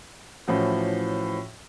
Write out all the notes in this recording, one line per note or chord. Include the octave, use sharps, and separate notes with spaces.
A2 E3 F3 C#4 F#4